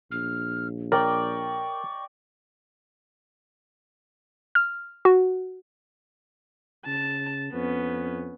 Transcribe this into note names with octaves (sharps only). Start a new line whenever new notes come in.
A#1 F6
A#4 D5 D#5 G5 C#6
F6
F#4
C#3 A5
F2 B3 C#4